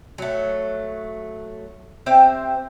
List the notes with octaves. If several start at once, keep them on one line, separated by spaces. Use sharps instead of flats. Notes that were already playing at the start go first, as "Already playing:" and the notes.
F#3 A3
C4 G4 C5 E5